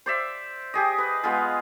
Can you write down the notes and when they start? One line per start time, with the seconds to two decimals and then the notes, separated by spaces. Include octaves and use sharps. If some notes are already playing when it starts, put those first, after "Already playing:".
0.06 C5 D5 E5
0.74 G4 G#4 D#5
0.98 B4
1.23 G#3 B3 F4 G#4